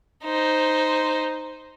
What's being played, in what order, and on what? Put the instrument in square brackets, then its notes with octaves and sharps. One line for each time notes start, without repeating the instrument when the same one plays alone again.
[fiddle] D#4 C5